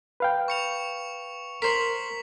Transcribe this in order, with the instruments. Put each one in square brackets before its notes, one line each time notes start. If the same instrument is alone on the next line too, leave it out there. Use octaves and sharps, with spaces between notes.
[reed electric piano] B4 F5 G5
[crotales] C#6 C#7 F7
[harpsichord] A#4 C5 [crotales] B6 F7 F#7